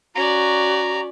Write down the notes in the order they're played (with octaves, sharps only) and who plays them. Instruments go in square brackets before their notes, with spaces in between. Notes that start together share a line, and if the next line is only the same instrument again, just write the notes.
[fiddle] C#4 D5 [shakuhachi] F#4 [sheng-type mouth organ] A#5